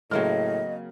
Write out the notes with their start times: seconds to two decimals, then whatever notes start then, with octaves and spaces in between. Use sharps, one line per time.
0.11 A2 C#3 F#3 A#3 C4 D#5 F6